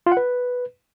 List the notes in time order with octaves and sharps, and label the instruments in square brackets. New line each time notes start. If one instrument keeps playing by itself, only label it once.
[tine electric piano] F4
F#5
B4